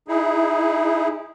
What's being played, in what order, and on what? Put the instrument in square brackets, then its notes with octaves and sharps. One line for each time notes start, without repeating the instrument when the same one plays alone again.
[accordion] D#4 E4 G#4